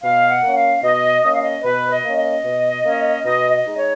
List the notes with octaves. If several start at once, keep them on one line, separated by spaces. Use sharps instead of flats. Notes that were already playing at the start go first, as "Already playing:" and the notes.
B2 F5
F#5
A#3 C#4
F5
B2 D#5
A#3 C#4 D#5
F5
D#5
B2 B4
D#5
A#3 C#4
D#5
B2
A#3 C#4
B2 D#5
D#5
G#3 D#4
C#5